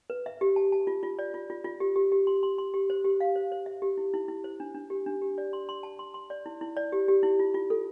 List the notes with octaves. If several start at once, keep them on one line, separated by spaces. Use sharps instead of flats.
B4
E5
G4
A5
A5
F4
F4
D5
F4
F4
F4
G4
G4
G4
C6
C6
C6
G4
C5
G4
F5
C5
C5
E5
G4
E4
E4
E4
C5
D4
D4
G4
D4
G4
D5
C6
C6
A5
C6
C6
D5
E4
E4
D5
G4
G4
E4
F4
F4
A4